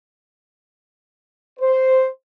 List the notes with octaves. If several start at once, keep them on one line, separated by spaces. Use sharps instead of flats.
C5